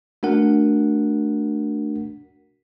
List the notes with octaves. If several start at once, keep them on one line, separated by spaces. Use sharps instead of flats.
A3 D4 F#4 A#4 F#5